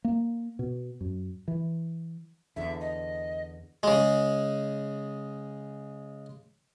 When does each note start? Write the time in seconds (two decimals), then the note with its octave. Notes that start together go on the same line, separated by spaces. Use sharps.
0.04 A#3
0.59 B2
1.01 F#2
1.48 E3
2.56 E2 D3 E5
2.81 D#5
3.83 C#3 G#3